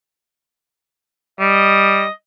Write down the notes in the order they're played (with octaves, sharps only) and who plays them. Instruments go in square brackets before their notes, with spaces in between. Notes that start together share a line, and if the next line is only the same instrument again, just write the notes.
[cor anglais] G3 [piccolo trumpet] D#5